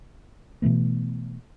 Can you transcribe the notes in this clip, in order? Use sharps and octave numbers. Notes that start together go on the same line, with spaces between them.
B2 E3 A3 B3